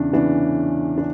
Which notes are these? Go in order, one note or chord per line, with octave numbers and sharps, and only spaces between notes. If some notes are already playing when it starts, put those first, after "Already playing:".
Already playing: E2 C#3 E3 C#4 D4
E2 C#3 E3 D4
D4